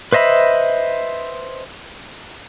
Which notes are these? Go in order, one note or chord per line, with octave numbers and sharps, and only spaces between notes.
B4 C5 D#5 E5 B5